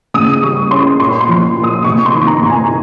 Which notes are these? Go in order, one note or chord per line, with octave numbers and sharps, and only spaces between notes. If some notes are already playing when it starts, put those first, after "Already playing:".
C#3 D#6
G3 C#6
C#4 C6
A#2 C6
C6
F3
A#2
D#6
C3 C#6
C6
D#3
A#5
C3
G#5